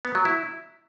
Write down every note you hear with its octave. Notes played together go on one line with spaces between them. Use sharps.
B3
F#3
E4